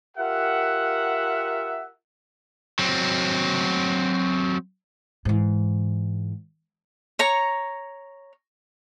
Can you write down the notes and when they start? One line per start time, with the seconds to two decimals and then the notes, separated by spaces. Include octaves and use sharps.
0.17 F4 G4 A#4 E5 F#5
2.79 F#3 C4
5.25 G#2 E3
7.19 C#5 A#5 C#6